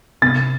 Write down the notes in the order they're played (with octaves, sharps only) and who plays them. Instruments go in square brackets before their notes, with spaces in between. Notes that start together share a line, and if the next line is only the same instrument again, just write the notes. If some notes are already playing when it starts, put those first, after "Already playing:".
[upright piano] C3 A6